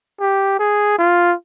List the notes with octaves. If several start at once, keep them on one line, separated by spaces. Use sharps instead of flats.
G4
G#4
F4